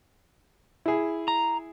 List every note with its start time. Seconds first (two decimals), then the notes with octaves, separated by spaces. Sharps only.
0.86 E4 G#4
1.28 A#5